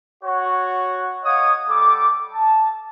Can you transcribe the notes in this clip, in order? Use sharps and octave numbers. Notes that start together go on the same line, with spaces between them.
F#4 C#5
C#5 D#5 F5 F#5 D#6
G3 A4 D6
A5